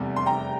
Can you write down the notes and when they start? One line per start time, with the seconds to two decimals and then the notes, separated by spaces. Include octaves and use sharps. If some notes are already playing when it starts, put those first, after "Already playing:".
Already playing: F1 E2 C3 G3
0.16 C6
0.26 G5 A#5